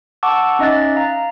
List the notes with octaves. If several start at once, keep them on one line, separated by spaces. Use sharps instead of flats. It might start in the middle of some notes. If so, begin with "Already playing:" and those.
F#5 A5 C#6 D6 E6
C#4 D#4 D#5 E5 F#6 A6
F5 A#5